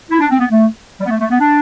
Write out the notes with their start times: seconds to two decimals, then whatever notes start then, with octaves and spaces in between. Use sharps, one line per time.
0.11 E4
0.20 D4
0.31 C4
0.40 B3
0.50 A3
1.01 G3
1.06 B3
1.10 A3
1.20 A3
1.30 B3
1.40 D4